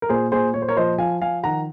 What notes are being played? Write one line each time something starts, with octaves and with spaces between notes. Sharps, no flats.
A#4
A#2 G#4 C5
A#2 G#4 C5
A#2 C#5
C5
A#4 C#5
F3 C5 D#5
F3 F5 G#5
F3 F5 G#5
D#3 F#5 A#5